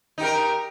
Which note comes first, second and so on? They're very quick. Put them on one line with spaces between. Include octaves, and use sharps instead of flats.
D#4 G4 A#4